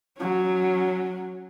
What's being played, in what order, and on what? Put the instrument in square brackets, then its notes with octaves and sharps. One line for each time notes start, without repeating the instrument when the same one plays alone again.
[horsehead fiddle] F#3 C#4